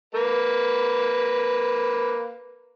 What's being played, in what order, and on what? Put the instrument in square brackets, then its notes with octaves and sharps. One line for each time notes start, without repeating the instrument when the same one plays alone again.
[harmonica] A#3 B4